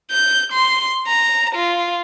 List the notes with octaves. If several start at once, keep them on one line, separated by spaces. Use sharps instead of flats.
G6
C6
A#5
F4